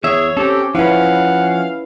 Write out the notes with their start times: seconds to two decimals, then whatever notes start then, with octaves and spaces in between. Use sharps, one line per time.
0.04 E2 G#4 C#5 E5
0.37 C4 C#4 G4 A4
0.75 F3 C#4 E4 B4 F5 F#5